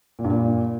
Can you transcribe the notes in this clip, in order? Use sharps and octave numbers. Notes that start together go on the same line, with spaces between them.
A#2
G2
A#2